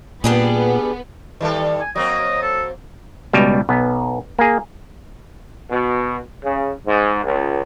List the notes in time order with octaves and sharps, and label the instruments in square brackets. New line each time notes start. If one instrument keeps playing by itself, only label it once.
[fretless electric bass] A#2 [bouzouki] G3 D4 G#4 [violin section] B3
[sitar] D#3 G3 A4
[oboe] G#5
[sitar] F#3 A#3 C4 [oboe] D#5
[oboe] A4
[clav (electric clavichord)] C#2 B2 G3
B1 B3
A#3 G#4
[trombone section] B2
C#3
G#2
C#2